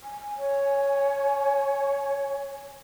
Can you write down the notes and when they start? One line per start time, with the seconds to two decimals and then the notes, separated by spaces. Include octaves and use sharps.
0.03 G#5
0.37 C#5